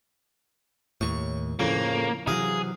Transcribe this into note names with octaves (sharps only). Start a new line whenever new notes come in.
D#2 A2 C#6
F2 A2 C#3 A#3
C3 E3 F#3 G#4 F5